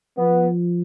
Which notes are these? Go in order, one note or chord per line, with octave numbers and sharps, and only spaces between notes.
F3 B3